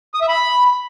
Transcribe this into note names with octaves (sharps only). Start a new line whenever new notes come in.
D#6
E5
B5